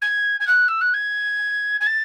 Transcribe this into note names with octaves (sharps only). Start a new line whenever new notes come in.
G#6
G#6
F#6
E6
F#6
G#6
G#6
A6